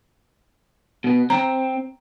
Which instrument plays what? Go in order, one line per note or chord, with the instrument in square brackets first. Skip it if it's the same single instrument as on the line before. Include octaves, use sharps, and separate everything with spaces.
[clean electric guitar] B2 B3
[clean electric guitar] C4 [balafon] A#5